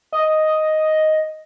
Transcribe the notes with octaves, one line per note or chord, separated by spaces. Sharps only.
D#5